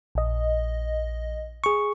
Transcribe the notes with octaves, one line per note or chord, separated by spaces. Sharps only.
A#1 D#5
G#4 C#6